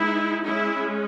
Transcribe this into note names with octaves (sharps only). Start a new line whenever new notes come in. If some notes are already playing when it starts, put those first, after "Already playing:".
Already playing: G#3 B3 D#4 E4
G#3 C#4 E4